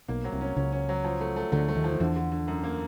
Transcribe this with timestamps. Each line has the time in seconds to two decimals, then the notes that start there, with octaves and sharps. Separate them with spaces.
0.08 B1 B2 A#3
0.24 F#3
0.32 C2 C3
0.41 C#4
0.56 C#2 C#3 C#4
0.72 C#4
0.89 F#3
1.04 F3
1.21 A3
1.36 A3
1.52 D2 D3 A3
1.68 A3
1.75 D#2 D#3
1.84 F3
1.92 D#3
2.00 E2 D3 E3
2.16 D3
2.32 D3
2.48 F#2
2.64 A#3